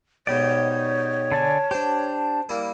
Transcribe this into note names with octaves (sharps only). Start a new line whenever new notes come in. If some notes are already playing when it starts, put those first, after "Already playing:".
G#2 B2 D#4 G4 C#5 D5
D3 D5 G#5 A5
D4 G4 C5 G5
G3 A#3 E4